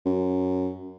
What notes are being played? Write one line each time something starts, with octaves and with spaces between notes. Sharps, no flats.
F#2